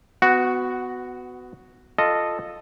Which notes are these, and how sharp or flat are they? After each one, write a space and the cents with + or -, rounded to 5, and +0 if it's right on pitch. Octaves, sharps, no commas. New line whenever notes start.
B3 +25 F#4 +0
F4 +0 A4 +0 D#5 -10